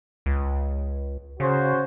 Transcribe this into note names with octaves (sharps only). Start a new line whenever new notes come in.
C#2
C#3 C#4 F#4 C5